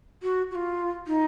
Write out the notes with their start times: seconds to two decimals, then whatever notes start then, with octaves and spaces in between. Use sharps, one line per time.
0.22 F#4
0.51 F#4
0.55 F4
1.07 D#4